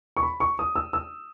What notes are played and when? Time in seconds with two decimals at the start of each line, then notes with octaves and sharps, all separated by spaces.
0.17 C#6
0.23 B5
0.40 C#6
0.59 D#6
0.76 E6
0.93 E6